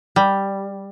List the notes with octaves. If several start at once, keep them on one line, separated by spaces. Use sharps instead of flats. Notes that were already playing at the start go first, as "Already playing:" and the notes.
G3